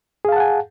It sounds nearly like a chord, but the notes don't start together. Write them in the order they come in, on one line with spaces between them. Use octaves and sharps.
G#4 F5 A5 F#5 G#5